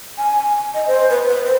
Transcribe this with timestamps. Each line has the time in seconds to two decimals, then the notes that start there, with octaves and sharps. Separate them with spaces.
0.18 G#5
0.75 D#5
0.87 C5
1.10 B4
1.29 B4
1.46 C5